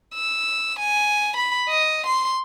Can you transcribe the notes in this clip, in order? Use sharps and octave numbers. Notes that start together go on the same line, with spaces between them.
E6
G#5
B5
D#5
C6